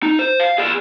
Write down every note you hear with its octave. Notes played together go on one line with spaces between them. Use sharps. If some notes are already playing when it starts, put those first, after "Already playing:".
D#4
C5
F5
G#4 D5